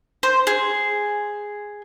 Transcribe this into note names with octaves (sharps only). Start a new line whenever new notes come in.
C5
G#4